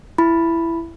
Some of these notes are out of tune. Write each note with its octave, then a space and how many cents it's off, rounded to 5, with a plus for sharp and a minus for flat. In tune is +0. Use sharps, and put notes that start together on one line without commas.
E4 +15 B5 +0